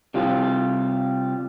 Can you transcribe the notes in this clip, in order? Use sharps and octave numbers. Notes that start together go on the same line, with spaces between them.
C3 G3 F4